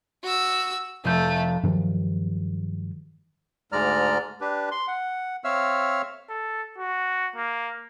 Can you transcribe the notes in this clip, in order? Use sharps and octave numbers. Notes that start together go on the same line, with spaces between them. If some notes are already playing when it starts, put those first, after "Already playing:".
F#4 E6
F1 A3 G6
G2 D#3 F3 F#3
D2 G#2 G#3 D5 A#5 F6
D4 G4 B4
C6
F#5
C4 C#5 E5 F5 E6 F6
A4
F#4
A#3